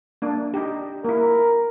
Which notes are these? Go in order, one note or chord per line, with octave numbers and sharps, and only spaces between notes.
A#3 D4
D#4 G4
A#3 E4 A#4